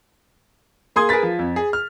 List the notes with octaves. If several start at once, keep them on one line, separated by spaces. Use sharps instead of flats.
A#3 G#4 C6 D#6 G#6
G#4 A#4 B4 A6 B6
F3
F2
G#4
F6